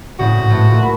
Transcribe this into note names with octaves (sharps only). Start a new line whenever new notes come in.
A2 C#3 C4 F#4
G#2 G6
A2 A3 B3
A#2 A3
B5